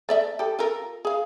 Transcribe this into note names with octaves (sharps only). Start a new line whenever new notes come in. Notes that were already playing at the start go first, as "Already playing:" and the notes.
A3 D5 E5
G4 A4
F4 A4 A#4
G#4 F5